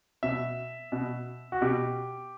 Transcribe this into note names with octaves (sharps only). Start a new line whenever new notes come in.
B2 E5
B2
F#4
B2 G4